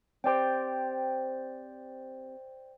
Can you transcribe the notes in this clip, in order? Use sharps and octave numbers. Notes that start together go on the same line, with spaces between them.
C4 G4 C5 D5 G5